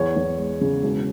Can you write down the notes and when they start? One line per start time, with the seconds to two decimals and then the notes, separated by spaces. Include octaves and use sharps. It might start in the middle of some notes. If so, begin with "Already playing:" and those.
Already playing: E2 C#5
0.16 E2
0.38 G#3
0.61 C#3
0.83 E1